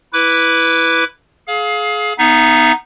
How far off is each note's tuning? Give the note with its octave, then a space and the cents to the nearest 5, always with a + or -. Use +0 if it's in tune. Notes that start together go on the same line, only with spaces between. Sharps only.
E4 +0 B4 +0 D6 -15
G#4 +30 F5 +20
B3 +0 D#4 +0 E5 +35